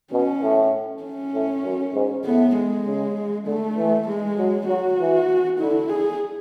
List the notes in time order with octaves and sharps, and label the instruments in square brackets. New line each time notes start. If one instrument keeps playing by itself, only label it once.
[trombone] B2 [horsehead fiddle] C#4
[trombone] A2
[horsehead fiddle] C#4
[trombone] A2
F#2
G#2
[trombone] A2 [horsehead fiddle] B3
[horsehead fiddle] G#3
[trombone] C#3
[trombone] D3 [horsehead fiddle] A3
[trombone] E3
[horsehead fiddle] G#3
[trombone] F#3
[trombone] F#3 [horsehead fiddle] F#4
[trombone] E3
[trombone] D3 [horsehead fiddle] E4
[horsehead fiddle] G#4